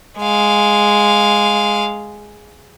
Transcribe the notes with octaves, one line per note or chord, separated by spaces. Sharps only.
G#3 F5